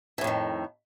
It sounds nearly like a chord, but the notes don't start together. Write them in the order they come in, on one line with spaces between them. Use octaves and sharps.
E3 A2 F2 D#3